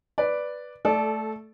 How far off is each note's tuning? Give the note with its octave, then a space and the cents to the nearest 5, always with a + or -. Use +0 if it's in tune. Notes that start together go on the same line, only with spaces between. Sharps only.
B4 +0 D5 +0
A3 +0 A4 -20 D5 +0